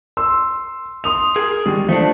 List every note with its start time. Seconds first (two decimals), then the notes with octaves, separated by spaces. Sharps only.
0.17 C6 E6
1.04 C6 D#6 F7
1.36 G#4 A#4
1.66 D#3 G3 G#3
1.89 F3 A3 D4